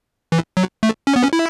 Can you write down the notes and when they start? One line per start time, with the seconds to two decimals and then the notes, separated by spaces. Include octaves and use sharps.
0.32 E3
0.57 F#3
0.83 A3
1.07 C#4
1.16 B3
1.23 C#4
1.33 E4